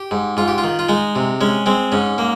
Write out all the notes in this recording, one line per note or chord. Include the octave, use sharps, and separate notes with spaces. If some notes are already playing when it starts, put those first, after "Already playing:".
Already playing: G4
G#2
G#2 F4
G4
F4
D#3
F4
G#3 D#4
C3
G#3 C#4
G#3 C4
G#2 C#4
A#3